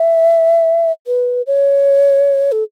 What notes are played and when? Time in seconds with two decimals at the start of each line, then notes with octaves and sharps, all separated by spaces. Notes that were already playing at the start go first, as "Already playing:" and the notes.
Already playing: E5
1.07 B4
1.47 C#5
2.52 A4